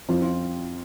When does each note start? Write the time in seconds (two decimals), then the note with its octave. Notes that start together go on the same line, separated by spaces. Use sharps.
0.09 F2 F3 C4 F4
0.22 F4